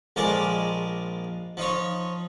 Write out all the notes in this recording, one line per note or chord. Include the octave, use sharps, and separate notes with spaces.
A#1 F3 G#3 A#4 D5 G#5
F3 D#4 C#5